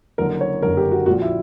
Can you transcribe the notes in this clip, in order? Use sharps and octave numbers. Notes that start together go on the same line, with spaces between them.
F#1 F#2 D3 A#4
C#5
F#1 F#2 D3 A#4
G4
F#4
A#1 A#2 F#4
E4